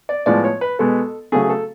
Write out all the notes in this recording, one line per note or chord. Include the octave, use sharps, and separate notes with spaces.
D5
A2 F3 G#3 B3 D5
C#5
B4
B2 G#3 B3 A4
C#3 F#3 A3 G#4
G#4
A4